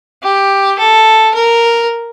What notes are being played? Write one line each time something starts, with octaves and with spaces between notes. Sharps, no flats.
G4
A4
A#4